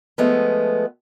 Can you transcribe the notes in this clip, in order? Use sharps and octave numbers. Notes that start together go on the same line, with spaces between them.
F3 G#3 A3 B3